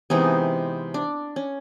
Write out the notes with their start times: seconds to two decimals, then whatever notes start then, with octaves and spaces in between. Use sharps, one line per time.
0.10 C3 E3 G#3 B3 D#4
0.94 D4
1.36 C#4